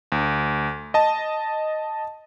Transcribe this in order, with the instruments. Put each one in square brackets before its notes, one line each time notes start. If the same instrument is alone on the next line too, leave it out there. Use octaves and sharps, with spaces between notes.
[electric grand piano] D2
D#5 A5